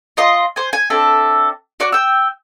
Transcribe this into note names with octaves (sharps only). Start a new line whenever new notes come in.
F4 D#5 C6
C5 G#5
G#5
C4 D4 A4 E5
F#4 D5 C#6 F#6
G5 E6